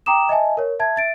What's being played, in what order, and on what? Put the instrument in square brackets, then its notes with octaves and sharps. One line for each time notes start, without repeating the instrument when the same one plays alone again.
[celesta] G5 A#5 D6 D#6 E7
D#5 E5 G#5 A5
A#4 C#5
E5 A5 G#6
E5 A6 D7